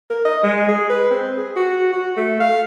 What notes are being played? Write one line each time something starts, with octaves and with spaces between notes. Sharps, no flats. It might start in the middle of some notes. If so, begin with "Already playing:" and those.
A#4
D#5
G#3
G#4
B4
C4
G#4
F#4
F#4
A3
F5